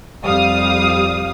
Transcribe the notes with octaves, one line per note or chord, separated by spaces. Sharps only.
F2 G3 F5 D#6